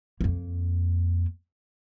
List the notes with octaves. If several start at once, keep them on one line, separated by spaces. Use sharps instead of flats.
F2 A#3